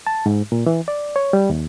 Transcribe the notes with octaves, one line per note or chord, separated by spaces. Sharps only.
A5
G#2
A#2
E3
D5
C#5
G3
D#2